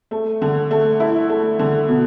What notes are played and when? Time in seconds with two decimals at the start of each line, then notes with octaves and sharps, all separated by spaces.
0.11 A3
0.42 D3
0.71 A3
1.00 E4
1.29 A3
1.59 D3
1.88 B2